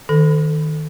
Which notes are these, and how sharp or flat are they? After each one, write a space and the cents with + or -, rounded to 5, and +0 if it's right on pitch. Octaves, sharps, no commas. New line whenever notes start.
D#3 +0 A4 +0